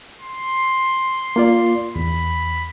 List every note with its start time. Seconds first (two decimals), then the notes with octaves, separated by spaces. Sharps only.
0.21 C6
1.36 A#3 F4 D5
1.96 E2 B5